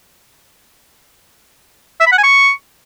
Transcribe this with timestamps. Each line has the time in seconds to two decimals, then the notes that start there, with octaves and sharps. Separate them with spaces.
2.00 E5
2.06 B5
2.12 F#5
2.18 G#5
2.24 C#6